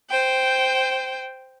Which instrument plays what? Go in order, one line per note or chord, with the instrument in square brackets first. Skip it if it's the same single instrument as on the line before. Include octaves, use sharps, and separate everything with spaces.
[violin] C5 G5